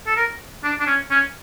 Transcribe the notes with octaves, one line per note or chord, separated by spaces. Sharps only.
A4
A#4
D4
D4
C#4
C#4